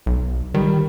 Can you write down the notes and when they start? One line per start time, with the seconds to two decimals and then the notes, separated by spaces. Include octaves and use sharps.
0.06 B1
0.54 D#3 G3